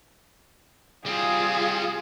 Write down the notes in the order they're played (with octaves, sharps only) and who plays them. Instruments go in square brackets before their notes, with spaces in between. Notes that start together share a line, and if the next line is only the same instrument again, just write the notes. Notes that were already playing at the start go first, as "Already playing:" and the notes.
[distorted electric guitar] G3 C4 [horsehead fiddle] F4 G#4